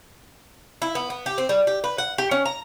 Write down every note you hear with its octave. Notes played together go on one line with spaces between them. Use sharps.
E4
B3
B3
G4
C4
G3
G4
B4
F#5
G4
C#4
A#5